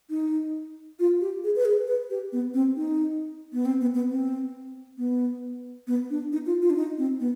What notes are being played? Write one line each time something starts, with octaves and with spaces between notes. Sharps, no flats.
D#4
F4
G4
G#4
B4
G#4
B4
G4
B3
C4
D#4
B3
C4
B3
B3
C4
B3
B3
D4
D#4
F4
F4
D4
D#4
C4
B3